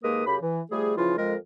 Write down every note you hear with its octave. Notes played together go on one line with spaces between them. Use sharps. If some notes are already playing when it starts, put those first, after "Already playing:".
D#2 G#3 A#3 A#4 B4 D#6
F#2 C#3 G4 B5
E3
F3 G3 A3 G#4
C#3 E3 F3 E4 F4
F2 G#3 A#4